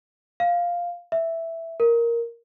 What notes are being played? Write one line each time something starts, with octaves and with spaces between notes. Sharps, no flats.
F5
E5
A#4